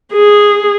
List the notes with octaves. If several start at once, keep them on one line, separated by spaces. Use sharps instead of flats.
G#4